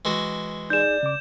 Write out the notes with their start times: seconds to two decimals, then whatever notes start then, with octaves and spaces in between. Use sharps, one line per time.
0.05 E3 G#3 F#4
0.70 D#4 G#4 D5 G6 E7
1.03 C#3 D6